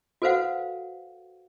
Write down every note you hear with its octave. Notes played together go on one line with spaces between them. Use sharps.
F#4 A4 B4 C5 F5 F#5